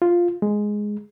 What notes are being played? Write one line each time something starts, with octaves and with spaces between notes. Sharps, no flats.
F4
G#3